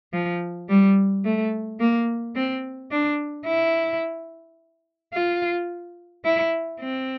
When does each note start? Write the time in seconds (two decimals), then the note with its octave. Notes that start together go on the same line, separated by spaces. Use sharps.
0.13 F3
0.69 G3
1.25 A3
1.80 A#3
2.36 C4
2.91 D4
3.46 E4
5.13 F4
6.25 E4
6.80 C4